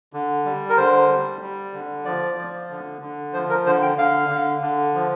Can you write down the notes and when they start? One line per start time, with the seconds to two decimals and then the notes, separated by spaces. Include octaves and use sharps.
0.13 D3
0.45 G3
0.70 A#4
0.77 D3 C5
1.09 G3
1.41 G3
1.73 D3
2.05 F3 D5
2.37 F3
2.70 D3
3.02 D3
3.33 F3 C5
3.50 A#4
3.65 D3 C5
3.82 G5
3.98 D3 F5
4.29 D3
4.62 D3
4.94 F3